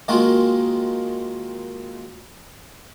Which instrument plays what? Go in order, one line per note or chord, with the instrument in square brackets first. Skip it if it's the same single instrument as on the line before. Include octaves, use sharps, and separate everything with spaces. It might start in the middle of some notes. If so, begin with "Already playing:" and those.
[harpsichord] D#3 G#3 A#3 F4 F#4